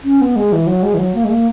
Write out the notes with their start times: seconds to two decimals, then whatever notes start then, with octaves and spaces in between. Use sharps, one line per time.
0.04 C#4
0.21 B3
0.36 G#3
0.52 E3
0.67 F#3
0.83 G#3
0.94 E3
0.98 F#3
1.15 A#3
1.24 G#3
1.30 A#3